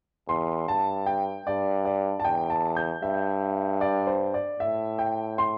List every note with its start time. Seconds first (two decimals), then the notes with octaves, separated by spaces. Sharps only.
0.28 E2 C6
0.68 G2 A5
1.06 G5
1.46 G2 D5
1.85 D5
2.20 A5
2.25 E2 G5
2.50 A5
2.76 G6
3.02 G2 E5
3.81 D5
4.07 C5
4.34 D5
4.60 A2 E5
4.99 G5
5.38 C6